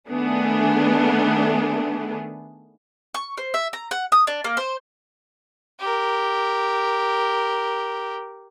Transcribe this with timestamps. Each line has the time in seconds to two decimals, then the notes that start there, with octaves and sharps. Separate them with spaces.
0.10 D#3 A3 B3 D4 G#4
3.14 C#6
3.37 C5
3.54 E5
3.73 A#5
3.91 F#5
4.12 D#6
4.27 D4
4.44 A#3
4.57 C5
5.80 G4 A#4